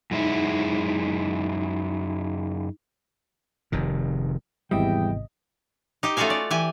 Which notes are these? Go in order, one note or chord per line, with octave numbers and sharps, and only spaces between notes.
F#2 G#3 D#4 E4
F1 C3 D#3
G#1 E2 C3 G3 E4 D#5 G5
D#4 G4
A3 C#4 F4 F#4 F5 G#5
D5
E3 G4 G#5